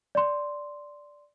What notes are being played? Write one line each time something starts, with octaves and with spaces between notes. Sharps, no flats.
D5 C6